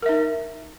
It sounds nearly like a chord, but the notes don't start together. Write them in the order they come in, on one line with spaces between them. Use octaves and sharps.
A#4 E5 D#4